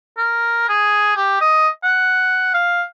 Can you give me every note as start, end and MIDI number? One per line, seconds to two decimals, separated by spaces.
0.18 0.68 70
0.69 1.16 68
1.16 1.37 67
1.41 1.68 75
1.84 2.53 78
2.54 2.83 77